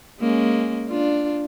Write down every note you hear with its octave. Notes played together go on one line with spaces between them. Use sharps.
G#3 A#3 C#4
D4 F4